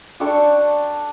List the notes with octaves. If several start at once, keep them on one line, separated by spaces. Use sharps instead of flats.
D4 A4 G5 C#6